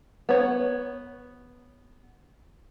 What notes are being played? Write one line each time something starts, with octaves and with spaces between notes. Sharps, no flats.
B3 C#5